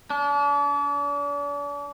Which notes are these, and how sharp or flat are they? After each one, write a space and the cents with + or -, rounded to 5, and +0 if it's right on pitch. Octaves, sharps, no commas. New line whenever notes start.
D4 -40